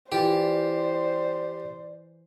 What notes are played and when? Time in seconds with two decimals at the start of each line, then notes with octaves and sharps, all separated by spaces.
0.12 E3 F4 G4 C5 D5